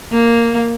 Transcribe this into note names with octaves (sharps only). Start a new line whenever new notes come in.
A#3